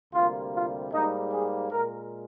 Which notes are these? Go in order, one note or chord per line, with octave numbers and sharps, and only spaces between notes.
D2 C3 G3 A#3 F4
F4
G#2 G3 A#3 D#4
G#4
A#2 G#3 A#4